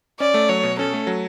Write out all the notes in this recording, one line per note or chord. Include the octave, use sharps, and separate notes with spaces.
C#4 D5
A3
F#3 C#5
B2
C#4 A4
A3
F#3